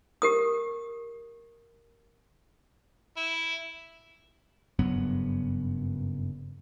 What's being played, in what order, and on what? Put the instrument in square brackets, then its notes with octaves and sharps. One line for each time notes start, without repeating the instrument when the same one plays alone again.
[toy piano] G4 A#4 D#6
[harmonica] E4
[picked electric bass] F#1 G2 F#3 B3